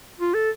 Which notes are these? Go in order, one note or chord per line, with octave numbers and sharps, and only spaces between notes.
F4
A4